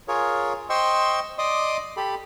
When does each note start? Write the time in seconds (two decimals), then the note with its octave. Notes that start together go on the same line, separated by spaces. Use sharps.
0.08 F4 G#4 A#4 C#5
0.70 C5 D#5 G5 C6 C#6 E6
1.38 D5 D#5 C6 D6 D#6
1.97 G4 A4 B5